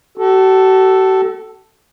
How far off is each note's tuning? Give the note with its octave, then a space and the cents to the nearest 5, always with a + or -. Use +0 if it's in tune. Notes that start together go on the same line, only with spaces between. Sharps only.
F#4 +45 A4 +0